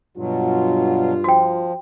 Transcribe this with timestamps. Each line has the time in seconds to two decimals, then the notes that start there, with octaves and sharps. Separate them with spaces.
0.17 G2 B2 F#3 F4
1.24 F3 F#4 G5